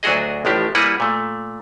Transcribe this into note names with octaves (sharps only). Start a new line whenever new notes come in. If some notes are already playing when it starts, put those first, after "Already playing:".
D2 F#3 D4 F#4 G#4 D#5
A1 A2 F3 D4 G4
G3 A#3 E4 G#4 B4 F#5
A#2 A3